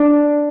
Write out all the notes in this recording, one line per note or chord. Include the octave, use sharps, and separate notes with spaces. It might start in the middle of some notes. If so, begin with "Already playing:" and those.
Already playing: D4